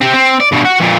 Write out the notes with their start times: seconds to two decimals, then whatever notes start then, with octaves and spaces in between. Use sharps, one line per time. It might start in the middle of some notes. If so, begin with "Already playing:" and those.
0.01 C4 G4
0.14 C4
0.40 D5
0.52 G2 B2
0.65 F#4 F#5
0.80 F2 A#2